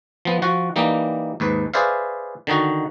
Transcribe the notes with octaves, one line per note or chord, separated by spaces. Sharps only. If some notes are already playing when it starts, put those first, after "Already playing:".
F3 B3
F3 F#4 F#5
E3 G3 A#3 D#4
D#2 G#2 B4
G#4 B4 C5 D5 E5 F5
D3 D#3 D#4 F#4